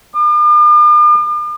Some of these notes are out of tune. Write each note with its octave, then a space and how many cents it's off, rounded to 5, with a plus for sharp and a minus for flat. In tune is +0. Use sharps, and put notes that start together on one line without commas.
D6 +45